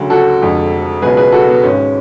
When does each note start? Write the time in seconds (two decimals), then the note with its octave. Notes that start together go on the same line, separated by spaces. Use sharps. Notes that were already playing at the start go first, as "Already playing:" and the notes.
Already playing: D2 C#3 F#3
0.10 F#4 A4
0.42 F1 F2 D3 G#3
1.02 C#2 B2 F#3 G#4 B4
1.17 G#4 B4
1.32 F#4 A4
1.49 B3
1.63 G#1 G#2 G#3 C#4